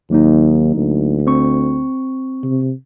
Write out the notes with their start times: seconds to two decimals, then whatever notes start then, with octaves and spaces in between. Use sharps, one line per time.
0.10 D#2 F#3 A#3 D#4
0.75 D2
1.27 C4 C#6
2.43 C3